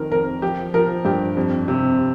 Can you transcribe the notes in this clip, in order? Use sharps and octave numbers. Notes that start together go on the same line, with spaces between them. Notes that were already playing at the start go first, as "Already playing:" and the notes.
Already playing: F2 D#3 A#4
F2 A#4
F3 G4
F3 A#4
G2 G4
F2
C3